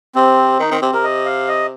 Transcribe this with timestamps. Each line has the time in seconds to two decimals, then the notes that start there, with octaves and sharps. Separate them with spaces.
0.15 C3 C4
0.59 D#3 D#4
0.71 D#3 C4
0.81 C3 C4
0.93 C3 A#4
1.04 D#5
1.26 F5
1.48 D#5